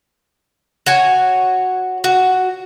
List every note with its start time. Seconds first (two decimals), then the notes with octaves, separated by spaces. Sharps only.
0.86 F#4 C#5 G#5
2.04 F#4